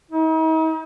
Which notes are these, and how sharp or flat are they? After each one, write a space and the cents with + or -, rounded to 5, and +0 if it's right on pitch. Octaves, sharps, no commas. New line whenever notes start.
D#4 +45